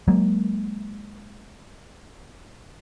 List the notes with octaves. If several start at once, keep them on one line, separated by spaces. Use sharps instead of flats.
F#3 G#3 A#3